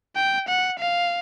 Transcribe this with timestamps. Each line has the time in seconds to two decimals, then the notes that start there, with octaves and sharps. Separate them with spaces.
0.16 G5
0.48 F#5
0.79 F5